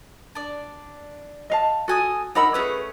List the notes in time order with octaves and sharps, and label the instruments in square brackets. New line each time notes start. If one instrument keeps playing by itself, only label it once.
[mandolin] D4 D5
[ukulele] D#5 F5 A5
[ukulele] F#4 [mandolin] A4 G#5 D#6
[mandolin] D4 A#4 E6 [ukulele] D#4 F#5 B5
[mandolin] A3 C#4 F#5 [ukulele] G#4 B4